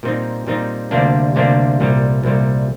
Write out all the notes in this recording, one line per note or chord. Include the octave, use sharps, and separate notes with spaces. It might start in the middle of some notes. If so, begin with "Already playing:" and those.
A#2 G3 C4 D#4
A#2 G3 C4 D#4
D2 C3 G3 A#3 D4
D2 C3 G3 A#3 D4
C2 A#2 G3
C2 A#2 G3